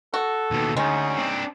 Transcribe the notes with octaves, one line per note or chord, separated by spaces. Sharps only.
F#4 A4
D#2 B2
D2 G#3 C#4 D#4
C4 D4